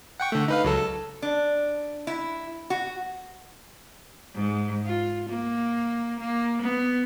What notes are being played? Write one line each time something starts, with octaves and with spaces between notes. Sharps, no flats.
F#5 G5 C#6
D3 A3
D#4 B4 F5
C#2 F#3 A4
A4
D4
E4
F#4
G#2
F4
A#3
A#3
B3